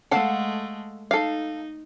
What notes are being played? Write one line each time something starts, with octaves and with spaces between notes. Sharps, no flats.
G#3 A3 A4 F5 F#5
D#4 A4 F5